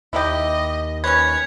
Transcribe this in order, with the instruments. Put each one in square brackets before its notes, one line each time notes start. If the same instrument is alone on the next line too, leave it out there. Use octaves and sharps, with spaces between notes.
[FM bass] D#2 [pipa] E4 G4 [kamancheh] D#5
[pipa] C#4 B4 [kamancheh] C#5 [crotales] G#6